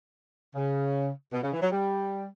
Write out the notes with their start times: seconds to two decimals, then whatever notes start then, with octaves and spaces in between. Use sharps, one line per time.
0.56 C#3
1.33 B2
1.43 C#3
1.52 E3
1.62 F#3
1.72 G3